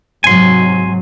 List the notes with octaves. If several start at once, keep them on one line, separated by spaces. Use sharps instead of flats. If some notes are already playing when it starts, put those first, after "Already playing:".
G#2 C3 F#3 G#5 C6